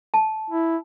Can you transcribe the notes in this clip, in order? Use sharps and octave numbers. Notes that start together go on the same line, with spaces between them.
A5
E4